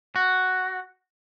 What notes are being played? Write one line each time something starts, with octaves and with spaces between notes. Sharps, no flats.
F#4